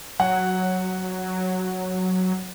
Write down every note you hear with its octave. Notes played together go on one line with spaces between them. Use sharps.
F#3 F#5